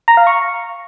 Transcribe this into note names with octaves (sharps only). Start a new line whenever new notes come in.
A#5
F5
C#6